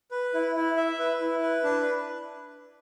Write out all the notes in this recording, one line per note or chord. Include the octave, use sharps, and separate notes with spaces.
B4
E4
E4
E5
B4
E4
B4
D4